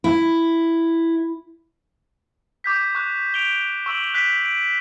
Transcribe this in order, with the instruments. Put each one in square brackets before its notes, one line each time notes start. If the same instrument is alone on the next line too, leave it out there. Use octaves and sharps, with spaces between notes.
[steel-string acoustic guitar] E4
[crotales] C#6 D6 G6 B6
C#6 F#6
D7 F7 G7
C#6 E6 D7 F#7
F#6 B6 D7
D7